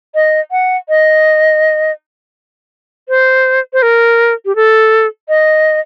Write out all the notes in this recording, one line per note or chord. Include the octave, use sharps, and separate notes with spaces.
D#5
F#5
D#5
C5
C5
A#4
G4
A4
D#5